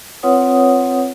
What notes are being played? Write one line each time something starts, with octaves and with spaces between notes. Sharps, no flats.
C4 F4 B4 C#5 F#5 D#6